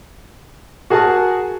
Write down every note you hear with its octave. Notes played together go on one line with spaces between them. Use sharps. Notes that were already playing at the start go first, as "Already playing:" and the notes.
F#4 G#4 A#4 G#5 A5